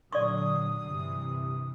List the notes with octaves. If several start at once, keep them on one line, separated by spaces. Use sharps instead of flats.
A#2 D3 F#3 D5 C#6 D#6
G2 C3 E3